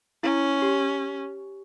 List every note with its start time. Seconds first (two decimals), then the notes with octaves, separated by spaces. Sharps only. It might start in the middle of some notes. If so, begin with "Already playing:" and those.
0.23 C#4 E4
0.62 G4